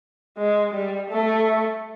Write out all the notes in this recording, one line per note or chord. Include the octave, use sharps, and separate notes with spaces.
G#3
G3
A3